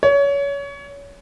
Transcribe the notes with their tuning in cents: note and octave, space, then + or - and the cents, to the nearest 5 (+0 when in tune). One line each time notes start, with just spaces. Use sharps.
C#5 +25